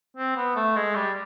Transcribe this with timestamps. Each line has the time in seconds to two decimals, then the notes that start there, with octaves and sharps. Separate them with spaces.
0.17 C4
0.37 B3
0.56 A3
0.76 G#3
0.95 G3